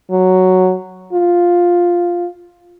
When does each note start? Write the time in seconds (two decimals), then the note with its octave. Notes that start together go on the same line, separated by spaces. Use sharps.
0.11 F#3
1.13 F4